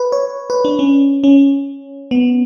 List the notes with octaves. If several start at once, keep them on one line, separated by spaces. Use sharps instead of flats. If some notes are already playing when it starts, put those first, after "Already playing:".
Already playing: B4
C#5
B4
D4
C#4
C#4
B3